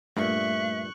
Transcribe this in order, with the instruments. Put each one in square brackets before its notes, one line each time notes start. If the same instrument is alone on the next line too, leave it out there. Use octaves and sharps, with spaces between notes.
[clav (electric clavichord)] G2 A#2 [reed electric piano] A3 [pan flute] E5 [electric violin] C#6 F#6